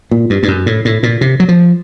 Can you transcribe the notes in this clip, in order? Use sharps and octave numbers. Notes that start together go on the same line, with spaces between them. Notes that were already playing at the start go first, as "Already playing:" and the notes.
A#2
G2
G2
F#2
A2
A2
A#2
C3
F#3
F3